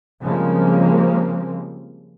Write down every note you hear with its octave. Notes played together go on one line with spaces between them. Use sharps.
C#3 F3 G3 G#3 A#3 C4